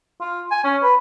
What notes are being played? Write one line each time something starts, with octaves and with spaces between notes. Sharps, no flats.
F4
G#5
C#4
B4